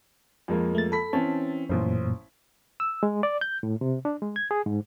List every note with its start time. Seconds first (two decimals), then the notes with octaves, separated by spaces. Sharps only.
0.48 F2 G#3 A#3
0.75 A3 A6
0.92 A4 B5 B6
1.13 E3 C4 C#4 A5
1.69 A1 F#2 A#2 C5
2.80 E6
3.03 G#3
3.23 D5
3.41 G6
3.63 A2
3.81 C3
4.05 D4
4.22 G#3
4.36 G#6
4.51 G#4
4.66 G#2